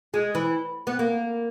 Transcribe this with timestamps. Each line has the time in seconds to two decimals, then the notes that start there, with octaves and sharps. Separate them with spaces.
0.14 G#3
0.35 E3
0.87 B3
0.99 A#3